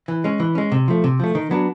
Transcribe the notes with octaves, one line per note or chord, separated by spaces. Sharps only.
E3
G#3 C#4
E3
G#3 C#4
C3
F3 A3
C3
F3 A3
D#3
F#3 B3 D4